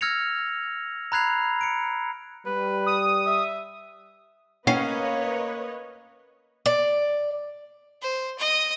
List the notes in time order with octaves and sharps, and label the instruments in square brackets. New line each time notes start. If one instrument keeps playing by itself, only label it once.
[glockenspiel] E6 F6 G#6 A#6 C#7 F7
A#5 B5 F#6 G#6 C7 F7
C#7 D7
[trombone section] G3 [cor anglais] B4
[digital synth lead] D#6
[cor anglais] E5
[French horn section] A#3 [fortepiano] C#4 [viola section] B4 C#5 D#5 [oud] F5
[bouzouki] D5
[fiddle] C5
D#5